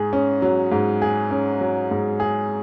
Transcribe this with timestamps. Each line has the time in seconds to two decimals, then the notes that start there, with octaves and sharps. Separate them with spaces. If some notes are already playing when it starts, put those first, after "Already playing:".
Already playing: G#2 G#4
0.13 C#4
0.42 F#3
0.72 G#2
1.02 G#4
1.31 C#4
1.61 F#3
1.91 G#2
2.20 G#4